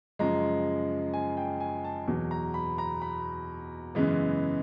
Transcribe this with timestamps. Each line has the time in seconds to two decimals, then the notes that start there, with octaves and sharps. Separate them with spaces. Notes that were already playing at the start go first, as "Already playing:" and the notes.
0.19 F#2 C#3 F3 G#3 A#5
1.14 G#5
1.37 G5
1.60 G#5
1.84 A5
2.07 E2 B2 F#3
2.31 A#5
2.54 B5
2.78 A#5
3.02 B5
3.95 F#2 C#3 E3 G#3 B3